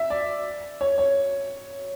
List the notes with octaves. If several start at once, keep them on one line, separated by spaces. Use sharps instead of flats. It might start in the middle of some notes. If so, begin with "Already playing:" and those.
Already playing: E5
D5
C#5
C#5